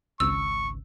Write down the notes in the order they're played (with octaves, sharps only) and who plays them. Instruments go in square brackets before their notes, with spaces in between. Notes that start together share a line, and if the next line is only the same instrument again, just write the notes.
[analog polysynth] G#1 C#2 [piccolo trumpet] C#6 [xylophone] E6